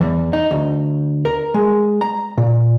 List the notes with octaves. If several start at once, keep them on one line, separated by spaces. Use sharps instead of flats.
E2
D#4
D2
A#4
G#3
A#5
A#2